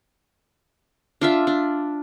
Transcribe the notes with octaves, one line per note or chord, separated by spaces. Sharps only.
D4 F4 E5
D4